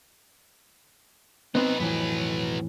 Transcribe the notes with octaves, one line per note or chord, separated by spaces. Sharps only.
B3 C4 D#4 B4
F2 A2 E3 F#3 B3